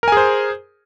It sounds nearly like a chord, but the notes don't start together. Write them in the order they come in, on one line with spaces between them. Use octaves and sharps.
A#4 G#5 G#4 C5